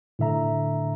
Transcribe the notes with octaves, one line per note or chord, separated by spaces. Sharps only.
A2 D3 E5 A#5